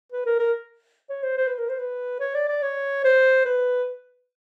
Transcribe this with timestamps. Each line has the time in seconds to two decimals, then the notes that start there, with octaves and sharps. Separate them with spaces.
0.12 B4
0.26 A#4
0.39 A#4
1.10 C#5
1.23 C5
1.37 C5
1.48 B4
1.58 A#4
1.69 C5
1.79 B4
2.20 C#5
2.34 D5
2.49 D5
2.62 C#5
3.04 C5
3.45 B4